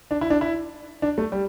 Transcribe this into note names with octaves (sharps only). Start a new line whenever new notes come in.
D4
E4
D4
E4
D4
A3
G3